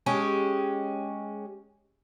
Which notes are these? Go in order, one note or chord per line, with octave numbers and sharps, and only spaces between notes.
G#3 C#4 G4